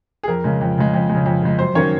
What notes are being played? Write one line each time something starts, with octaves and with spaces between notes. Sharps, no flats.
G#4
F2 A#4
C#3 G#3
F2
C#3 G#3
F2
G#3
C#3
F2
C#3 G#3
F#2 C5
D#3 F#3 A#3 C#4 C#5